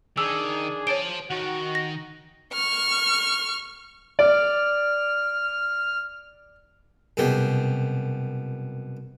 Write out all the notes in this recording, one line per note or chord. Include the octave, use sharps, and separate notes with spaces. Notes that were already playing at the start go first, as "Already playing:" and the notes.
D#3 D4 G#4 E6
C5 C#5 A5 D7
D#3 F#4
A#6
C#6 F6
D5 F6
C2 F#2 B2 G4 G#4